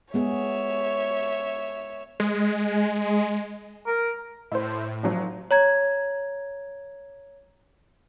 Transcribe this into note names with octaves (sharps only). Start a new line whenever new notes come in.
G#3 B3 G#4 C#5 E5
G#3
A#4
A2 E4 C5
G#1 F3 F#3
C#5 A#5 G#6